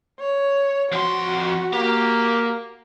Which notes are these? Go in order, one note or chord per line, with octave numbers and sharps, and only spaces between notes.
C#5
F2 F#4 C6
A#3 G4